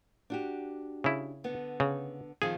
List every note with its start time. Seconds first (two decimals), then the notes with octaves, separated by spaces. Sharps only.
0.30 D4 F#4 G4
1.04 C#3 E4
1.44 D3 B3
1.80 C#3
2.42 D#3 F3 C4 G#4